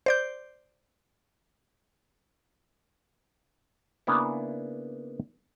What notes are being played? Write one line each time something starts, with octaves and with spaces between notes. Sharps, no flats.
C5 D5 G6
C#3 A#3 B3 D4 E4